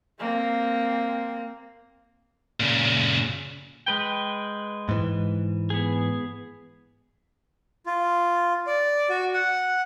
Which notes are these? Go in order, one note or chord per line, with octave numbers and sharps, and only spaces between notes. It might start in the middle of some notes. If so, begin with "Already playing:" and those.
A#3 C4
A#2 C#3
G#3 B4 G5
G#2 E3
B3 G#4
F4
D5
F#4
F#5